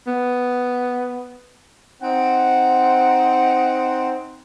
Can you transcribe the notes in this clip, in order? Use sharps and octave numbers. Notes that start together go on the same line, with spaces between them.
B3
C4 D#4 F#5